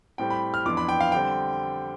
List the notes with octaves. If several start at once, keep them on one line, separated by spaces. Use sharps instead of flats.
A2 G3 C4 G5
B5
F6
F2 E3 B3 D4 D6
B5
G5
F5
D3 G3 C4 G5